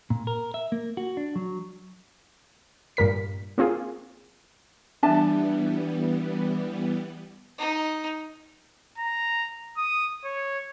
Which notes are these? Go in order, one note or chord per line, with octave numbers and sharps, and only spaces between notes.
A#2
A#4
E5
A#3
F#4
D4
F#3
G2 A#2 A#4 B6
A#3 C4 F4 G#4
E3 G3 B3 D4 E5 A5
D#4
A#5
D#6
C#5